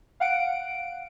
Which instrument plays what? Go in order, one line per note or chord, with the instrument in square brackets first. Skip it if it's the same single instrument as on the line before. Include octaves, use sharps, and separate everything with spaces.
[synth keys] F5 F#5 D7